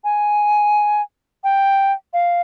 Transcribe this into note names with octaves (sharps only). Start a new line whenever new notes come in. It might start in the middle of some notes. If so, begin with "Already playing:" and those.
G#5
G5
F5